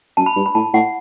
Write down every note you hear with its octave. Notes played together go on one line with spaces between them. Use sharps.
F#2 A5
B5
G2
B5
A2 A5
A2 F#5